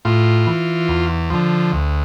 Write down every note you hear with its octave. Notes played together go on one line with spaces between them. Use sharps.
A2 F4
E3
E2
D3 F3
D2